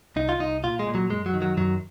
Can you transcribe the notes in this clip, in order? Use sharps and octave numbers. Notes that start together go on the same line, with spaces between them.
C2 D#4
F4
C2 D#4
A#2 F4
G#3
A#2
F#3
F#2 G#3
F#3
D#3
F#3
F#2 F#3